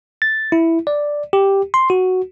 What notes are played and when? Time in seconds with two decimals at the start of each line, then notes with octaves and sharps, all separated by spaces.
0.22 A6
0.52 E4
0.87 D5
1.33 G4
1.74 C6
1.90 F#4